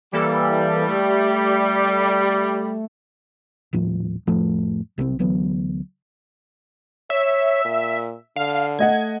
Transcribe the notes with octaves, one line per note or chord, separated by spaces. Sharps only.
E3 G3 A#3 A4
A3
D#1 A2 F3
F2 A2 F3 A3
B1 C3 F3 C4
D2 E3 F#3 B3
C#5 E5
A#2
D3 F5
A3 D#5 F#5 G#6